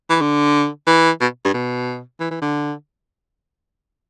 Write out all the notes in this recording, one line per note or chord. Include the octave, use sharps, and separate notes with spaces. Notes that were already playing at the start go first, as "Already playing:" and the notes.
E3
D3
E3
B2
G2
B2
E3
E3
D3